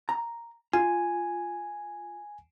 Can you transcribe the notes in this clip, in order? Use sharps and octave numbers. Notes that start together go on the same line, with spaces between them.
A#5
F4 G#5